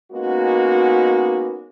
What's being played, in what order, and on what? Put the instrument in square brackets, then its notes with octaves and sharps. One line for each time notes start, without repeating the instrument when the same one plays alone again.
[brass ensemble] G#3 A#3 B3 C#4 D#4 F#4